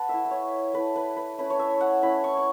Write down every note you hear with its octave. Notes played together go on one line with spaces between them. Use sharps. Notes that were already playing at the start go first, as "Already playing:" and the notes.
Already playing: B4 F#5 A5 C#6
A3 E4 E5
E5
C#5
A3 E4 B4
B4
B4
A3 C#4 E4 B4
C#5
E5
F#5
A3 C#4 E4 B5
C#6
C#6